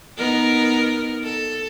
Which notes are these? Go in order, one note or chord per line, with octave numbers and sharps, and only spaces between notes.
B3 D#4 A#4
A4